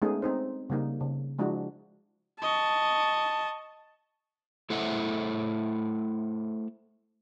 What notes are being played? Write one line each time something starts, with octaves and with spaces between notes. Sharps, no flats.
G#3 A3 B3 C#4 D#4 G#4
C4 D#4 C5
C#3 G3 A#3 D#4
C#3
F3 G#3 D4 E4 F#4
D#5 A5 C#6
A3 E4 A4 C5 E5 F#5